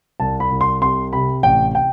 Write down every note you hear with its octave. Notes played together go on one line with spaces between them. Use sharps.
C2 A5
B5
C2
C6
C3 C6
C3 B5
A1 G5
G5